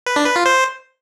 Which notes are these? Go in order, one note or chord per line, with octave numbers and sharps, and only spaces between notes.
B4
D4
B4
F4
C5